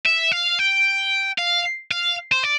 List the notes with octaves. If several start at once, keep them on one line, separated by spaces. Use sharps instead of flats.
E5
F5
G5
F5
F5
C5
D5